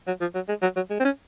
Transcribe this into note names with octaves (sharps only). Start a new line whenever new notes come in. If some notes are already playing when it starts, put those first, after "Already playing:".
F#3
F3
F#3
G#3
F#3
F#3
G#3
C4
C#4